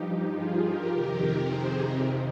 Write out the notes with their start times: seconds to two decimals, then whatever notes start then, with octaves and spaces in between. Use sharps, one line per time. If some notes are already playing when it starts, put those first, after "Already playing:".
Already playing: G2 F3 D#4 G4
0.34 F4 G#4
0.63 G4 A#4
0.91 F2 C3 D#3 G4 A#4
1.49 G#4 C5
1.77 G4 A#4